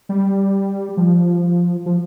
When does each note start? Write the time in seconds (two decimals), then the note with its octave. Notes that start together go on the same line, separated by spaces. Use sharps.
0.09 G3
0.97 F3
1.86 F3